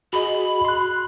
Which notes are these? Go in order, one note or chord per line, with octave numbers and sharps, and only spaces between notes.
F#4 G#4 D#5 B5
C6 F#6